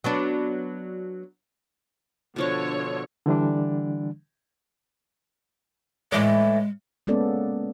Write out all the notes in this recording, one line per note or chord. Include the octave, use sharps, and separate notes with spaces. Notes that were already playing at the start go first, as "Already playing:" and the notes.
F#3 B3 D4
B2 D3 F3 D4 C#5
D3 E3 G3 D4
A2 E3 G#3 D5
G#3 A#3 B3 C#4 A4 D5